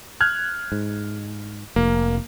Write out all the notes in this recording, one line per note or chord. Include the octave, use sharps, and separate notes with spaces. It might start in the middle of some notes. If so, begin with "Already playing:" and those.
F6 F#6 G#6
G#2
F1 A#3